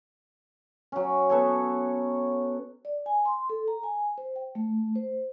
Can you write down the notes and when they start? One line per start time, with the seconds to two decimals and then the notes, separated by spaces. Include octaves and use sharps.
0.92 F#3 C#4
1.30 B3 A4 C#5
2.85 D5
3.06 G#5
3.25 C6
3.50 A4
3.68 A#5
3.83 G#5
4.18 C5
4.36 G5
4.55 A3
4.96 C5